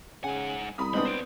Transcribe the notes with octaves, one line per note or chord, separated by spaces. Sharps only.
G#2 C#3 F#5 G#5
C2 A#5 B5 D#6
G#3 B3 C4 D4 B5 D#6
B3 C5 D5